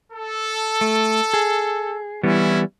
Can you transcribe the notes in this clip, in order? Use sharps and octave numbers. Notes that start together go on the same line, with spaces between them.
A4
A3
G#4
E3 G3 B3 C#4 E4